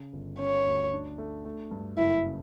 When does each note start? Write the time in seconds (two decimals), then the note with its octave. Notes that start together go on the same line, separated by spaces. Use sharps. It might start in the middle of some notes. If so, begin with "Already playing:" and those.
Already playing: C#3
0.13 G1
0.39 C#4 C#5
0.66 D2
0.93 D4
1.18 A3
1.45 A3
1.71 G2
1.98 F#1 E4
2.25 C#3